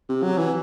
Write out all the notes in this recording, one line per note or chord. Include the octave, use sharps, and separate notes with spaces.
C3
F#3
E3